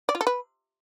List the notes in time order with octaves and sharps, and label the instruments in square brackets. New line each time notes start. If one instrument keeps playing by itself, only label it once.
[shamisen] D5
F4
A4
B4